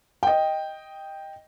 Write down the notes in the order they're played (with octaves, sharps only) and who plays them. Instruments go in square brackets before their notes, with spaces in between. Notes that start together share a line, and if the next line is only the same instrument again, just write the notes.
[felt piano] D#5 G5